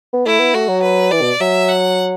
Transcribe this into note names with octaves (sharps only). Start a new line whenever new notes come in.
B3
A3 E4
B3
A3 F#4
F#3
B4
E3 D5
B2
F#3 E5
F#5